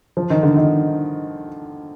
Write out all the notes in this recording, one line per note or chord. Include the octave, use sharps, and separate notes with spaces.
F3
D#3
D3
D#3